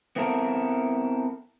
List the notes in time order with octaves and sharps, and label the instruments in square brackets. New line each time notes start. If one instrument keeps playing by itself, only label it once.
[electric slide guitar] B3 C4 E4 A4 A#4